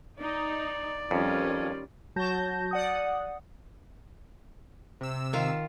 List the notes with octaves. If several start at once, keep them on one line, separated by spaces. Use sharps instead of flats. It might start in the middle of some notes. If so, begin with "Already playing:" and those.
D#4 D5
F2 D#3 G3 C#4 F4
F#3 F#4 A5 G6 A#6
D5 F#5 D#6
C3 E6
D#3 F4